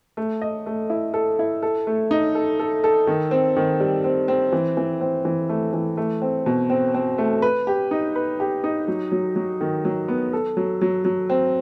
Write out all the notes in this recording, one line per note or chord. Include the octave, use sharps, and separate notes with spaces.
A3
D#5
A3
E4
A4
E4
A4
A3
D#4
A4
A4
A4
D#3
C4
D#3
G3
C4
C4
E3
E3
C4
E3
A3
E3
A3
C4
B2
C4
C4
A3
B4
G4
D#4
B4
G4
D#4
F#3
F#3
F#3
D#3
F#3
B3
A4
F#3
F#3
F#3
C4